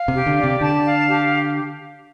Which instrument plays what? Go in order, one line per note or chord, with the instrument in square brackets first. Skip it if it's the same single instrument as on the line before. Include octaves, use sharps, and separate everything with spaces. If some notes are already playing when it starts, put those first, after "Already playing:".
Already playing: [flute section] F5
[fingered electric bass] C3
[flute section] G4
[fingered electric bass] D3
[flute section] D5
[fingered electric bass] C3
[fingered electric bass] D3 [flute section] A5
[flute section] F5
G4